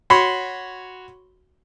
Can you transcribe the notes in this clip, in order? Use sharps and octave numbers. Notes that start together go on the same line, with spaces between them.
F#4 C#5 B5 C6